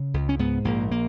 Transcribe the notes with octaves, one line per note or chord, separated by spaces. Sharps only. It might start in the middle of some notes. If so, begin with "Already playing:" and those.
Already playing: C#3
C#2
C#4
G#2 B3
A#1 A#3
A#3